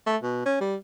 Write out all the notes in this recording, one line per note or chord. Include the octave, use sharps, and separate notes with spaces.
A3
B2
C#4
G3